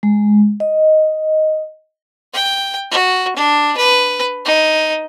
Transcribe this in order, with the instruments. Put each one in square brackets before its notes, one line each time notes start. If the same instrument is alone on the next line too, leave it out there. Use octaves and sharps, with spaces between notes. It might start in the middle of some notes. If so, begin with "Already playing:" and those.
[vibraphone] G#3
D#5
[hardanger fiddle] G5
F#4
D4
B4
D#4